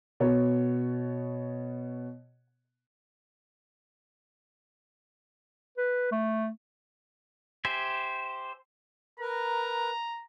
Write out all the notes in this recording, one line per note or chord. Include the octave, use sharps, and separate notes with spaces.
B2 B3 C#5
B4
A3
G4 C5 E5 G#5
A#4 B4 A#5